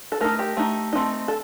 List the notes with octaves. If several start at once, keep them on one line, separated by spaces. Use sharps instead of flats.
A4
A3 D#4 A#4
G4
A3 D#4
A3 C4 D#4
A4